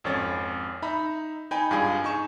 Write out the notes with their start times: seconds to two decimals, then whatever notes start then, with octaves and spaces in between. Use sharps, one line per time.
0.04 G#1 F2 C#4 C#5 A6
0.82 D#4 E5 A#5 B5
1.51 D#4 G5 G#5 B5
1.70 G#1 G2 F4 G#4 G#5
2.04 D#4 G#5 C#6 E7